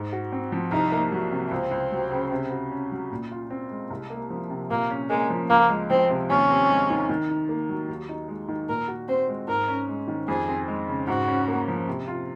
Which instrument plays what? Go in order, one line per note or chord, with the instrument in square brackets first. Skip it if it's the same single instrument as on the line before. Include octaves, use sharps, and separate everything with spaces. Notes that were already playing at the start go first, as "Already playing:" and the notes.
Already playing: [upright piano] G#2
F#4
C4
F3
[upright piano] C2 [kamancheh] D#4
[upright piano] A#3
F#3
C3
[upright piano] C#2 [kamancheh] C4
[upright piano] C#2
F#3
C#3
C3
F#4
C#4
F#3
A#2
F4
C4
G#3
C2
A#3
F3
C3
[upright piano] A#2 [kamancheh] A#3
[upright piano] C#4
[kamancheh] G#3 [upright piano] A#3
[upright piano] F3
[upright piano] C#2 [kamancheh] A#3
[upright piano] G#3
[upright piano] F3 [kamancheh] C4
[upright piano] C3
[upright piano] D#2 [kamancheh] C#4
[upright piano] C4
G#3
D#3
D#3
D#4
A#3
F#3
D#2
D#4
G#3
D#3
[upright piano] A#2 [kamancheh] A#4
[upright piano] F#4
[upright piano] C4 [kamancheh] C5
[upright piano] G#3
[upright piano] G#2 [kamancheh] A#4
[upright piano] C#4
G#3
D#3
[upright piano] F2 [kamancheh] G#4
[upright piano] C4
G#3
C#3
[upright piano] G#2 [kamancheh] F#4
[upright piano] C#4
A#3
F3
C3
F4